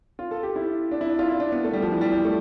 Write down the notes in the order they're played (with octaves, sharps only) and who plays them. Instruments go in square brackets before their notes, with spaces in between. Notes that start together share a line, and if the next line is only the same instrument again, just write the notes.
[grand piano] F4
A4
G4
E4
D4
E4
D4
F4
E4
D4
B3
A3
G3
F3
E3
G3
G3
A3